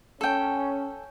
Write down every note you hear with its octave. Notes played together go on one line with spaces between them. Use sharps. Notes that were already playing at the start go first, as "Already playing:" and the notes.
C#4 A4 G5